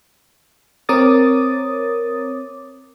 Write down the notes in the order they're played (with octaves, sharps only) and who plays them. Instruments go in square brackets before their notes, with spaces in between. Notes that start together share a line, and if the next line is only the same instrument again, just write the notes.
[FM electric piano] C4 A#4 C#5 D6 D#6 A6